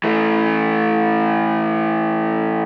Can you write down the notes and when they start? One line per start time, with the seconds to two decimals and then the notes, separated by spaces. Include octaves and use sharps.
0.04 E3 A3